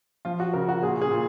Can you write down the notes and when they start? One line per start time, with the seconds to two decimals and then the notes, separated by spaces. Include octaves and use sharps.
0.25 F3 F4
0.40 F#4
0.54 C#3 A#4
0.69 F#4
0.83 A#2 G#4
1.02 G#4
1.11 A#2